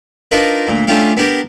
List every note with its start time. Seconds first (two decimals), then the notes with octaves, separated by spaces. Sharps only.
0.31 D4 D#4 F4 A#4 B4
0.67 D2 A#2
0.87 A3 C#4 D4 F4 G4 F5
1.17 B3 D4 G4 A#4